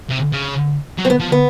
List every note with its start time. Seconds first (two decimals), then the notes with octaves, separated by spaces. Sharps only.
0.10 C3
0.32 C#3
0.98 F#3
1.05 C4
1.10 B3
1.20 F3
1.32 B3